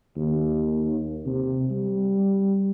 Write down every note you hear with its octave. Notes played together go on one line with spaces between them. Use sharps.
D#2
C3
G3